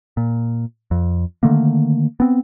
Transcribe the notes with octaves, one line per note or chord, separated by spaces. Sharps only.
A#2
F2
D3 D#3 A3 A#3
B3 C4